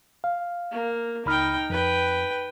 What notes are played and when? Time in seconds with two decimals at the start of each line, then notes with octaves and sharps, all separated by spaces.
0.24 F5
0.71 A#3
1.26 C#2 D#4 G5 B5 F6
1.70 F2 B4 G5